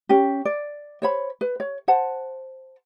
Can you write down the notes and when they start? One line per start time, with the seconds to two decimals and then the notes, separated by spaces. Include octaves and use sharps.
0.09 C#4 G4
0.45 D5
1.02 C5 C#5 B5
1.41 B4
1.60 C#5
1.88 C5 F#5 A5